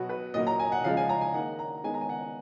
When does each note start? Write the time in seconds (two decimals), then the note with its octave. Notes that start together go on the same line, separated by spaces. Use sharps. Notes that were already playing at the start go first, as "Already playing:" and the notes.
Already playing: B2 F#3 B3 F#4
0.09 B4
0.34 A#2 F#3 A#3 D#5
0.47 A#5
0.60 G#5
0.72 F#5
0.84 C#3 F3 G#3 F5
0.97 G#5
1.09 A#5
1.21 G#5
1.34 D#3 A#3 F#5
1.59 A#5
1.84 D#3 G#3 B3 G#5
1.94 A#5
2.01 G#5
2.09 F#5